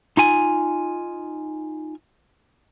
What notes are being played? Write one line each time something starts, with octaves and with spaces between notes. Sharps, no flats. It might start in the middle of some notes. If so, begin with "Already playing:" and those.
D#4 F4 G#5